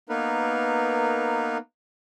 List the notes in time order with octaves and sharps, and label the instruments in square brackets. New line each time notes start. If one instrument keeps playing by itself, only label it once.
[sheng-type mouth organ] A#3 B3 D#4 A#4 B4